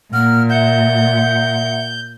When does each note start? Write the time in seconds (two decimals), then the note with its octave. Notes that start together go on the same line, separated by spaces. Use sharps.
0.13 A#2 A#3 F#5 F6
0.50 E5 F#5 G6